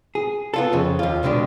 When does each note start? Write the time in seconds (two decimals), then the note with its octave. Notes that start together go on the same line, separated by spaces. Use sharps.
0.15 G#4
0.54 B3 F4 A4
0.73 F2 C#3
0.99 D#2 F4
1.23 C#2 B2 D3 G#3 G4